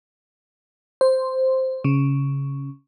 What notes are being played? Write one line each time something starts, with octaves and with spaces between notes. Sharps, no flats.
C5
C#3